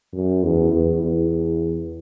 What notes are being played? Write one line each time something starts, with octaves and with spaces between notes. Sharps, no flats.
F#2
E2
E2
E2